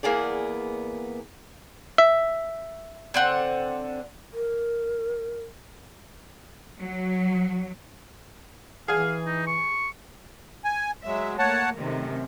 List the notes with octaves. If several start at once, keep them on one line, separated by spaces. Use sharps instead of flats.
E2 A#3 B3 G#4 D5
E5
D3 C4 F#5
A#4
F#3
E3 G#4 F5 G#5
D#4
C#6
G#5
F#3 G#3 E5
A3 A#3 C#5 F#5 A5
F#2 C3 D#3 A3